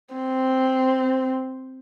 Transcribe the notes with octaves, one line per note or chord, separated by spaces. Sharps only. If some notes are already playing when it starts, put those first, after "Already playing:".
C4